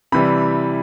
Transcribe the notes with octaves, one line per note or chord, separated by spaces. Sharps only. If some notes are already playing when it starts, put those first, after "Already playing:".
C3 E3 G3 B5